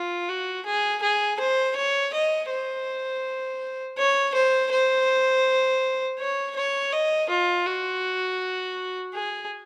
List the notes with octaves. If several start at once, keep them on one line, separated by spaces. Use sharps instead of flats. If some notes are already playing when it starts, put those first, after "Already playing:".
Already playing: F4
F#4
G#4
G#4
C5
C#5
D#5
C5
C#5
C5
C5
C#5
C#5
D#5
F4
F#4
G#4